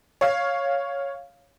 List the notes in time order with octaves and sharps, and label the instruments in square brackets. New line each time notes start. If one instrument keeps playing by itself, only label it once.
[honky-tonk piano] C#5 F5